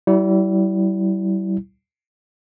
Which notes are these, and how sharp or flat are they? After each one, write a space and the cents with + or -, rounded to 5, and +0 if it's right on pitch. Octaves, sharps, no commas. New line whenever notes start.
G3 -40 E4 -5